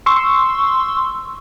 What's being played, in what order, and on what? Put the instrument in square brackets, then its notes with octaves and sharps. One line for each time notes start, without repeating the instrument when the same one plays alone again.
[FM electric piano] C6 C#6 E6